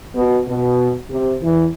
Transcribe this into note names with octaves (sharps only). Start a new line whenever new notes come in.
B2
B2
C3
E2 E3